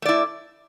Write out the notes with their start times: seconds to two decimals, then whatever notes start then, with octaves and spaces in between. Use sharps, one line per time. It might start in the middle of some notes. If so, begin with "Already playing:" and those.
0.02 A3
0.05 D5
0.09 E4